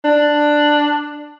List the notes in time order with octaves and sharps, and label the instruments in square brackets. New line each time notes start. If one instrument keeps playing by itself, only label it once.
[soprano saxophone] D4